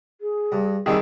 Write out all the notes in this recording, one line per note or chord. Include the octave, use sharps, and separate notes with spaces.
G#4
G2
D#3 G3 C4 E4 G#4